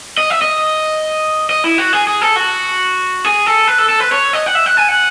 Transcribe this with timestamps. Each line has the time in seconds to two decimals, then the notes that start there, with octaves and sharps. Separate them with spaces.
0.17 D#5
0.30 E5
0.42 D#5
1.50 D#5
1.64 E4
1.78 F#4
1.93 G#4
2.07 G#4
2.21 A4
2.36 F#4
3.25 G#4
3.46 A4
3.67 B4
3.78 A4
3.89 A4
4.00 B4
4.12 C#5
4.33 D#5
4.46 F#5
4.55 E5
4.66 F#5
4.77 G#5
4.88 F#5